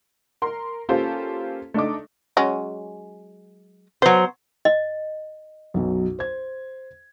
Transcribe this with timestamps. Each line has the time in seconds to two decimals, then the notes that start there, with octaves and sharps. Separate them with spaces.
0.42 A#4 C6
0.89 A#3 C#4 F4 G4 A4 C5
1.74 A3 D4 D#4 D6
2.37 F#3 G#3 C#4
4.02 F#3 B3 C5
4.65 D#5
5.74 B1 F#2 B2
6.19 C5 G#6